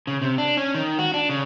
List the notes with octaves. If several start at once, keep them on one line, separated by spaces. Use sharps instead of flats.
C#3
C3
D4
C#4
D#3
F#4
D4
C#3